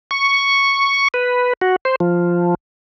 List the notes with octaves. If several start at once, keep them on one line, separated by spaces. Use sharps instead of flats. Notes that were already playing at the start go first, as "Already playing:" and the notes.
C#6
B4
F#4
C5
F3